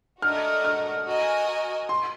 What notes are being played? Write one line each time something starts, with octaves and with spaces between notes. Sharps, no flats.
A3 D4 F#4 A#4 D#5 F6
F6
F#4 A#4 D#5 G#5
C6